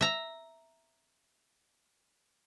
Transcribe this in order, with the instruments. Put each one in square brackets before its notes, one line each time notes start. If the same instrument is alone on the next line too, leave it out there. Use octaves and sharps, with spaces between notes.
[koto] E5 A#5